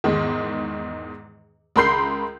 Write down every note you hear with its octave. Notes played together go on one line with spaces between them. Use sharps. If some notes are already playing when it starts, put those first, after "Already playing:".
E2 G#2 D#3
C#2 A#4 B5 C6 G6 C7